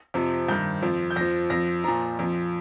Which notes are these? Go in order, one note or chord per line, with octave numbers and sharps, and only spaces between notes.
F2 C3 F3
G2 D#3 G6
F2 F3
G6
F2 F3 A#6
F2 F3 A#6
A#2 F3 A#5
F2 F3